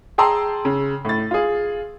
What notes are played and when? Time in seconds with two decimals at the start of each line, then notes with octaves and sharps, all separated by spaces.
0.18 G#4 G5 A5 A#5 C6 E6
0.65 C#3
1.05 A2 A6
1.31 F4 G#4